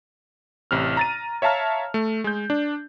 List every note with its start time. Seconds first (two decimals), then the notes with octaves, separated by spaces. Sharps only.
0.71 A1 C3 F6
0.97 A#5 A6 D#7
1.42 C#5 E5 F5 A5 A#5 F6
1.94 A3
2.24 G#3 G6
2.50 D4